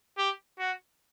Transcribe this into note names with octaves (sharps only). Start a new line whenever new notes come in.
G4
F#4